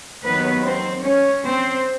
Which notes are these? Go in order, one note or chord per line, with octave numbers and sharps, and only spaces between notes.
D#2 D#3 F#3 B3 B4
C4 C5
C#4 C#5
C4 C5